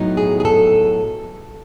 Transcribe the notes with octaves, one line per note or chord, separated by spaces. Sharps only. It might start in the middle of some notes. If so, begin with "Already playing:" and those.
Already playing: A2 F#3 B3 D#4
G#4
G#4
A4